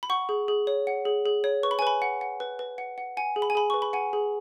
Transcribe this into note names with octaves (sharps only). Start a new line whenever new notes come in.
B5
F#5 C#6
G#4
G#4
C#5
F#5
G#4
G#4
C#5
B4 C#6
B5
G#5
B4 B5
F#5
F#5
B4
B4
F#5
F#5
F#5 G#5
G#4
B5
G#5
G#4 B5
B4 C#6
B5
F#5 G#5
G#4